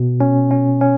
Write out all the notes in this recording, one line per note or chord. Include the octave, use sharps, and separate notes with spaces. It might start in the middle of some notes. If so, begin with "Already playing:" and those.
Already playing: B2
C#4
C#4
C#4